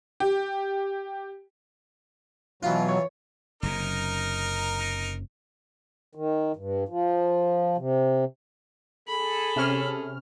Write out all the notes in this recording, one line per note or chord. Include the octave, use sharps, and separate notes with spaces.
G4
B2 E3 F#3 F4
C#5
F#1 F#2 C3 D#4 A#4
D#3
G2
F3
C3
G#4 A4 B5
C3 C#4 F6